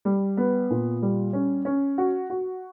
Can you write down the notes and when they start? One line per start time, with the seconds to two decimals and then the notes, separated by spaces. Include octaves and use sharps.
0.05 G3
0.37 B3
0.70 A#2
1.02 G3
1.33 C#4
1.65 C#4
1.98 F#4
2.30 F#4